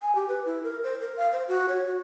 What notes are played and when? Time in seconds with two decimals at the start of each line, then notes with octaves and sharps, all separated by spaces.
0.02 G#5
0.15 G4
0.28 B4
0.46 E4
0.63 A#4
0.84 C5
1.01 A#4
1.17 F5
1.32 C5
1.48 F#4
1.69 C#5
1.86 F#4